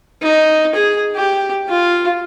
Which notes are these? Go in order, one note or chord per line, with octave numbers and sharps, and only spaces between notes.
D#4
G#4
G4
F4